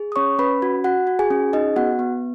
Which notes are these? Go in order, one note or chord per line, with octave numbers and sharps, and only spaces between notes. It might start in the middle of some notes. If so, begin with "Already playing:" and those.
Already playing: G#4
D#6
C#4 C#5 C#6
C#4 B4 B5
F#4
F#4 F#5
F#4
G#4 G#5
C#4
D#4 G#4 D#5
B3 F#4 F#5
B3